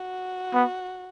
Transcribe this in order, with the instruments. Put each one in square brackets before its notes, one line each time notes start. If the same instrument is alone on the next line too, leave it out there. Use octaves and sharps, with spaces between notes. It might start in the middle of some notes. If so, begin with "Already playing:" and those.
Already playing: [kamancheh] F#4
[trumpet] B3